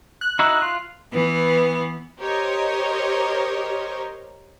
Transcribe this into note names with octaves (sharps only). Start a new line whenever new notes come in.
F#6
D#4 E4 F#4
F4
E3 B3
G4 A#4 C5 C#5 D#5